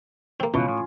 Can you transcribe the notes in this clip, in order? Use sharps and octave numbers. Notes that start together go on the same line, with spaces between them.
A#3 C4
C#2 B2 E3 C#4 F4
A2